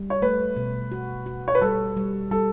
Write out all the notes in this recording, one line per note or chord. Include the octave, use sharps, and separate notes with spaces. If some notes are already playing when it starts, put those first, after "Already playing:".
Already playing: G3
C#5
A3 B4
B2
F#4
F#4
C#5
B4
G3 A4
G3
G3 A4